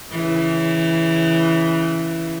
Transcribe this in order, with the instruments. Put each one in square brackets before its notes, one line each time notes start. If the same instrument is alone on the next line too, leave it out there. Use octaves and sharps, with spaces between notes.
[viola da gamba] C#3 E3